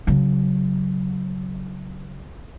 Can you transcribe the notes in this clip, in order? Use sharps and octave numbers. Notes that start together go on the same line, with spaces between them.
C#3 F#3